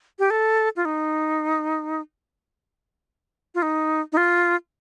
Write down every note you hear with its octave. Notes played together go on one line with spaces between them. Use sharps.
G4
A4
F4
D#4
F4
D#4
D#4
F4